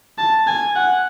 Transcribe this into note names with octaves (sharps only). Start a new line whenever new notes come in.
A5
G#5
F#5